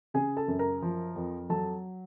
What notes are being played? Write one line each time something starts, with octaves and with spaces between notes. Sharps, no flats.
C#3 G#4 G#5
A4 A5
F#2
A#4 A#5
F3
F2
F#3 A4 A5